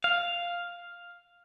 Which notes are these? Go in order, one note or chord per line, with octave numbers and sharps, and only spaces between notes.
F5